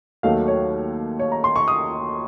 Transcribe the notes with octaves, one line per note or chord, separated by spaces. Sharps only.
D#2 D#3 F#3 A3 F5
C#5
C#5
A#5
C6
C#6
D#6